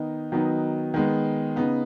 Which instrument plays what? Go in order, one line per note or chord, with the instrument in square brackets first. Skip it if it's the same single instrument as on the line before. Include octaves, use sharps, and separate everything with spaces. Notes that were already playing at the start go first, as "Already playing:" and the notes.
Already playing: [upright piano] D#3 B3 D#4
D#3 F#3 B3 D#4
D#3 G#3 B3
C#3 B3 D#4